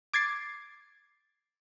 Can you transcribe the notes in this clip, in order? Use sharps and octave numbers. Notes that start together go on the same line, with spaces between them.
D6 G#6 A6 C7